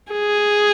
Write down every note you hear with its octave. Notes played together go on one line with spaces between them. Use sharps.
G#4